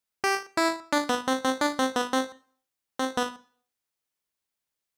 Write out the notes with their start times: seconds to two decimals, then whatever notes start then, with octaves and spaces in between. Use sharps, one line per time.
0.24 G4
0.57 E4
0.93 D4
1.09 B3
1.28 C4
1.44 C4
1.61 D4
1.79 C4
1.96 B3
2.13 C4
2.99 C4
3.17 B3